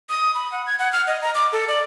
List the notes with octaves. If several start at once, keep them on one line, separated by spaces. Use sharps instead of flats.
D#6
B5
F#5
G#6
F#5
F6
D#5
A#5
D6
A4
D5